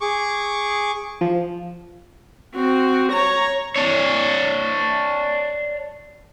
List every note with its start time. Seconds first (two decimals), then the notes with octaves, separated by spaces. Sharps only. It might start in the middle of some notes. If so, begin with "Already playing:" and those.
0.01 G#4 C#6 D6
1.21 F3
2.55 C4 F#4
3.12 C#5 A#5
3.76 D4 C#5